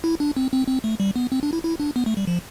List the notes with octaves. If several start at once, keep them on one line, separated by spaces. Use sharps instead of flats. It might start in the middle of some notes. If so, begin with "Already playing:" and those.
E4
D4
C4
C4
C4
A3
G3
B3
C4
D4
E4
E4
D4
B3
A3
G3
F3